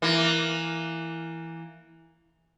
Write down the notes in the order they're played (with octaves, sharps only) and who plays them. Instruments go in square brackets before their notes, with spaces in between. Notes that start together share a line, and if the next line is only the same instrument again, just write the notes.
[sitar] E3 A#3